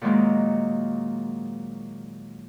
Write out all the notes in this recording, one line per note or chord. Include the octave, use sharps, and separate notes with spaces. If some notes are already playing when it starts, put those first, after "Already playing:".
A#2 D#3 F#3 G#3 A#3